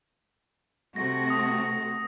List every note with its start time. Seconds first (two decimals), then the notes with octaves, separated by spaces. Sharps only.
0.96 C3 A3 F#4 A#6
1.30 D#6